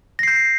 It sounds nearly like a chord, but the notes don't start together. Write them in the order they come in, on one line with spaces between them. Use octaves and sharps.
A#6 C7 G6